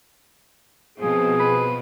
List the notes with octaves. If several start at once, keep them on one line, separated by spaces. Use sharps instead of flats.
B2 F3 C4 G#4
B4